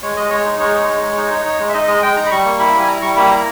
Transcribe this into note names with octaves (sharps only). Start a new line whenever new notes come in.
G#3 C#5
G#3 D#5
G#3 C#5
D#4
G#3 C#5
D#4
G#3
G#3
D#4
D#4
D#4
G#3
E5
D#4 D#5
G#3 D#5
G#3 G5
D#4 A#5
B5
G3 C#6
A#3
E4 B5
G3
G#5
E4 A#5
G3 C#6
A#3 B5
E4 A#5